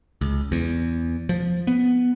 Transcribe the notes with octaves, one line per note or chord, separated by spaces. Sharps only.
C#2
E2
F3
B3